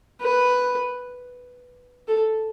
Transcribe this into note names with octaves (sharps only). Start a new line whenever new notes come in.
B4
A4